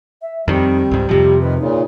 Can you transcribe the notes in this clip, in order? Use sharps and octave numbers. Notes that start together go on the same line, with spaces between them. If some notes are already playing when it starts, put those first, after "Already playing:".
E5
F2 D#3 G3 C4
C#2 G#2
F2 C3 F3 G4
D#3 B4
A#2 C#3 D#4